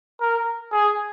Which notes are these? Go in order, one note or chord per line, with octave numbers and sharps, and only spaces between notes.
A#4
G#4